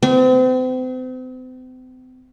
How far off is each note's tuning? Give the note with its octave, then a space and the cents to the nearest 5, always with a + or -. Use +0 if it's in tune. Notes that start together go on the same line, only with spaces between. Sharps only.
C4 -40